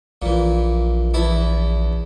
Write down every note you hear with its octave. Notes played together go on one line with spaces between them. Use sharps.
A#1 A#2 E3
E2 E4 A5